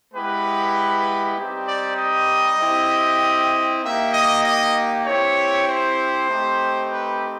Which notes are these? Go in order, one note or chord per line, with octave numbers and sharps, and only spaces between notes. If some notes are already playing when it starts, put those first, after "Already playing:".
G#3 B3 E4 G4 B4
G3 C4 D#4 G4
D5
D#5
C4 E4 G4
A#3 D#4 G4 E5
D#5
D#5
C4 E4 G4 C#5
C5
A3 C4 D#4 G4
B4